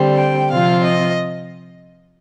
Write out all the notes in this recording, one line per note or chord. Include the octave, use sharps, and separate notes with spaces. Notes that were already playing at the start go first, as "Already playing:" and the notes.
Already playing: D3 G3 C4
G5
C3 F3 C4 F4 F5
D#5